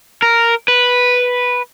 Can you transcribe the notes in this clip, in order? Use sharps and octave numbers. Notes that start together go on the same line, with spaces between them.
A#4
B4